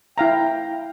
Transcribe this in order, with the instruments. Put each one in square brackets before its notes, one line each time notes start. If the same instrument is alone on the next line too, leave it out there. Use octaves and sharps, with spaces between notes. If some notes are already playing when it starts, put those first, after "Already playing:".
[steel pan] E4 F5 A#5 [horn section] G5